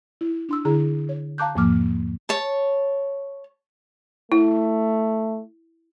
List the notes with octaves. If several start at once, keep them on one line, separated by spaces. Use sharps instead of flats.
E4
D4 C6 E6
D3 E4 G#4 A#5
C#5
F5 A5 A#5 D6 F#6 G6
E2 G#2 F3 A#3 D6 F6
C#5 A5
A3 E4